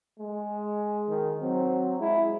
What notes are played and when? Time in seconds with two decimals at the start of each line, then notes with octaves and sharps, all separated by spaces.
0.19 G#3
1.09 D#3
1.41 F#3 C4
2.00 G#3 E4